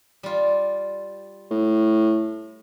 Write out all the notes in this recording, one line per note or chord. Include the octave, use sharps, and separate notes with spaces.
G3 F4
A2